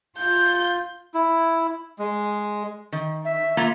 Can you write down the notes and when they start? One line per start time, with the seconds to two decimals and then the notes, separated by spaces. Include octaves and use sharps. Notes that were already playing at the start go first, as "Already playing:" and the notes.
0.18 F4 G6
1.14 E4
1.99 G#3
2.92 D#3
3.25 E5
3.57 A#3 F4 A#5